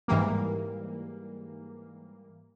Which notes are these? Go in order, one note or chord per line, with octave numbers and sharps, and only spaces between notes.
G#2 E3 G3 A#3